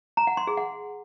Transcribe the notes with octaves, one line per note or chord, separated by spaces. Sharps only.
A#5
F#5
C6
G#4
F#5